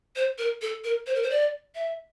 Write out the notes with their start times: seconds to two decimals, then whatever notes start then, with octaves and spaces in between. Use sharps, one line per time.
0.16 C5
0.38 A#4
0.62 A4
0.84 A#4
1.07 C5
1.15 A#4
1.23 C5
1.30 D5
1.75 E5